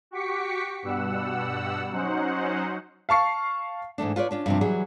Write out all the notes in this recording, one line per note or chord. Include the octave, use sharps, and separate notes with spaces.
F#4 G4 C#6 D6 B6 C#7
G2 B2 G3 F#5 E6
F#3 C#4 D#4 C5 F#5
F5 A5 C#6 C7
G#2 E3 A3 D4
F4 B4 C#5 D5
C#4 D4 F4
G2 C3 F3
E3 F#3 G3 G#4